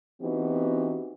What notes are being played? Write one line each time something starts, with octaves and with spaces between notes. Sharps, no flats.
E3 B3 C4 D#4 F#4 G4